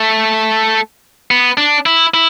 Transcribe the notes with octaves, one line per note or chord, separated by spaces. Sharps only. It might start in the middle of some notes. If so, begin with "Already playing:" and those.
Already playing: A3
B3
D4
E4
E4